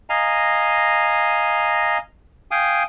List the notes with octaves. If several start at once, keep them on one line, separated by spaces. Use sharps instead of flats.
D#5 F5 G#5 A#5
F5 G5 G#5 D#6